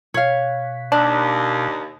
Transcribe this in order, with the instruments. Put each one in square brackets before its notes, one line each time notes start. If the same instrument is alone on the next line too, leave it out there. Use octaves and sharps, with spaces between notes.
[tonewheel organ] B2 [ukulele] C#5 F5
[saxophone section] D#2 [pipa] D4